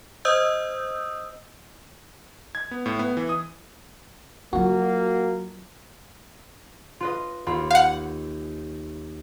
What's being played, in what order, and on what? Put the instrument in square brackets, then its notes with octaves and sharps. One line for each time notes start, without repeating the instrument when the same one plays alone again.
[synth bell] C5 D#5 D#6 E6 G6
[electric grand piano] G#6
B3
A2
B3
E3
D#6
[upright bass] F#3 F4 [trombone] A#3 [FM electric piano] F#4
[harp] F4 B4 D#5
D#2 F4 B5
[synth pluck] F5 F#5 [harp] G6